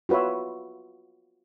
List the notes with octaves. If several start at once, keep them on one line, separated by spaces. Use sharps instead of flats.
F4 F#4 B4 C#5 E5